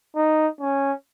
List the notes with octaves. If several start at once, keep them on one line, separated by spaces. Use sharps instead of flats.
D#4
C#4